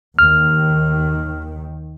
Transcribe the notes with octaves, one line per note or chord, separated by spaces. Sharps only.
D#2 D#3 F6